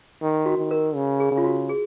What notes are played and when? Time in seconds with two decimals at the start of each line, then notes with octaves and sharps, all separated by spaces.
0.22 D#3
0.46 F#4
0.58 D#3
0.71 A#4
0.95 C#3
1.20 G#4
1.32 C#3
1.37 F4
1.44 F#4
1.69 G#4